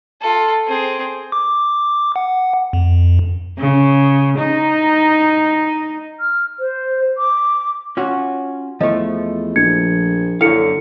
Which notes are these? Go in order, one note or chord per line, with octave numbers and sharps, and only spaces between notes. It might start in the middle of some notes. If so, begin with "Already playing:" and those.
F4 A4
C4 G#4
D6
F#5
F2
C#3
D#4
F6
C5
D6
C#4 F4 F#4
E2 F3 A3 D#5
A#1 G#6 C#7
F#2 D3 E4 A4 F5 C#7